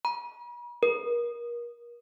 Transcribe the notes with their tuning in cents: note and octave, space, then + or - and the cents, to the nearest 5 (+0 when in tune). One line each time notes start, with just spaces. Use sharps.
B5 -45
A#4 +30